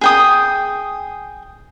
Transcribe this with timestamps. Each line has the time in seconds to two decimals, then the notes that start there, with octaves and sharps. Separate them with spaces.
0.01 G#4 G5 D#6